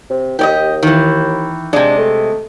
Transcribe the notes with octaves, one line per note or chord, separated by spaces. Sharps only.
C3
D#2 G4 D5 D#5
D#3 E3
C3 G#3 D4
A3